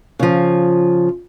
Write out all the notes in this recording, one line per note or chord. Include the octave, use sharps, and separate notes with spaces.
C#3 F3